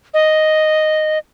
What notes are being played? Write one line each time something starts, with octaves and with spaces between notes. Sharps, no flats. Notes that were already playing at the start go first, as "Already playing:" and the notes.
D#5